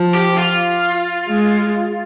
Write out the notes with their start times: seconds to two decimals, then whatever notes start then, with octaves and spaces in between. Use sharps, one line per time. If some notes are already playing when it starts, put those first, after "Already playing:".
Already playing: F3
0.15 G4
0.37 F4
1.29 G#3